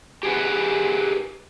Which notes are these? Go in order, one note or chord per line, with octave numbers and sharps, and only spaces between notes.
G4 G#4 B4 F#5